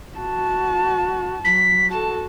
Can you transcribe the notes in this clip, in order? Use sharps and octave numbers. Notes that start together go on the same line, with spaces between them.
F#4 A5
F#3 B6
F#4 A4 A5